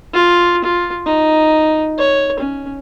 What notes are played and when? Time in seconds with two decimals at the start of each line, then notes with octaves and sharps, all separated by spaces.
0.13 F4
0.64 F4
1.06 D#4
1.98 C#5
2.39 C#4